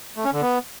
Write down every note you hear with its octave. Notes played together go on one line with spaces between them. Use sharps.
A3
C#4
D3
B3